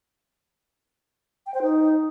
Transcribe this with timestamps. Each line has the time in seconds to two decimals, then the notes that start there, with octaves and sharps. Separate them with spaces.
1.46 G5
1.54 C5
1.62 D#4